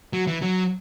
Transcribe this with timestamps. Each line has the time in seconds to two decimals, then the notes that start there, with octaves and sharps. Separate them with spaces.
0.13 F#3
0.27 E3
0.42 F#3